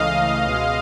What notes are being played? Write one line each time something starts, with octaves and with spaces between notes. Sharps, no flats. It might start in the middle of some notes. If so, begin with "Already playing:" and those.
Already playing: C#2 C#3 E3 A3 D#5 F5
C#2 B2 G#3